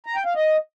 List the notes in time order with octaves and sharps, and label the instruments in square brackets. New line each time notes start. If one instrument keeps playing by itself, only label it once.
[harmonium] A#5
G5
F5
D#5